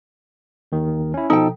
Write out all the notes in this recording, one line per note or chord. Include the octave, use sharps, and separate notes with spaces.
D#2 D#3
C#4 E4
B2 F3 D#4 A4 G5